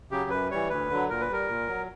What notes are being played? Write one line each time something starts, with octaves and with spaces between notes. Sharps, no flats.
C#3 F#3 G4
F#2 B4
E3 G3 C#5
D2 B4
D3 F#3
A#2 A#4
B4
G3 A#4
A#2
F#3